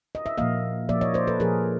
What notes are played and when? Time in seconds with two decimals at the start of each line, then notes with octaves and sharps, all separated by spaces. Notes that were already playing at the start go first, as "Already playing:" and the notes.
0.15 D#5
0.26 E5
0.37 A#2 F3 A#3 D#5 F5
0.89 A#2 F3 A#3 D5 E5
1.01 C#5 D#5
1.14 C5 D5
1.27 A4 B4
1.40 A#2 F3 A#3 G#4 A#4